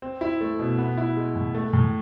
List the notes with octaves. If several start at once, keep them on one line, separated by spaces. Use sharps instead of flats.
C4
E4
A3
B2
B3
E4
G#3
A2
A3
A2